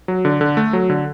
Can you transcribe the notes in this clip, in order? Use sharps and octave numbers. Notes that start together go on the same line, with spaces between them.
F#3
D3
D3
A3
F#3
D3